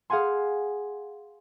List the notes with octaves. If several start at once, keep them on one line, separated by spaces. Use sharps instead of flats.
G#4 F5 F#5 G#5 C6